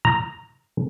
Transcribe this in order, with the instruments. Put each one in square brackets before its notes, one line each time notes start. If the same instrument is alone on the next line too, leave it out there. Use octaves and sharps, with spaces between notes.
[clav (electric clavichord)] A#5